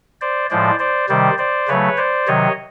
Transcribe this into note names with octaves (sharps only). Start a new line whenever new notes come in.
C5 D5
A2 F3 G#3 C5 D5
C5 D5
C3 D#3 G3 C5 D5
C5 D5
C#3 F#3 A3 B4 C#5
C5 D5
C3 D#3 F#3 C#5 D#5